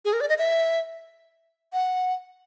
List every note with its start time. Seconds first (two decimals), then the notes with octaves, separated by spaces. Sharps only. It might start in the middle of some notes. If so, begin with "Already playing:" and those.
0.05 G#4
0.13 A#4
0.21 D5
0.29 D#5
0.38 E5
1.73 F#5